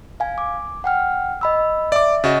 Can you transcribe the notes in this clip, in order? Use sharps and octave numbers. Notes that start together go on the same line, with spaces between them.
F5 G#5
D6
F#5 G5 F6
D#5 B5 E6
D5 E5 D6
C#3 F#4 D#5 A6